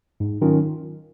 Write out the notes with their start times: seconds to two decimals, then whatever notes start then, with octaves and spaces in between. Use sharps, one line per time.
0.20 G#2
0.42 D#3 F#3 C#4 F4